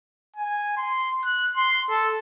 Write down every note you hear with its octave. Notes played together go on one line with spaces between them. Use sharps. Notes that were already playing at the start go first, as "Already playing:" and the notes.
G#5
C6
F#6
C6
A4